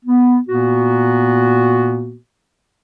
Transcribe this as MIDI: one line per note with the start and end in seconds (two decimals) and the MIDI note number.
0.04 0.39 59
0.48 2.16 46
0.48 2.16 58
0.48 2.16 59
0.48 2.16 66